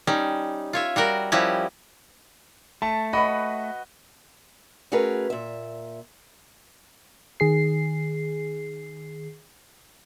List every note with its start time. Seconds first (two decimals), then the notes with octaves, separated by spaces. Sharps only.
0.07 G3 C#4 D#4
0.73 F4 C#5 E5
0.96 G3 F#4 A#4
1.32 F3 G3 C#4 E4 F#4 G4
2.82 A3 A5
3.13 F#4 B4 D#5 B5
4.92 A3 C#4 F#4 G#4 A#4 B4
5.30 A#2 E5
7.40 D#3 G#4 C7